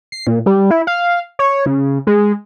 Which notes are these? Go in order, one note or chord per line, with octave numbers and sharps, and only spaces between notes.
C7
A#2
G3
E4
F5
C#5
C#3
G#3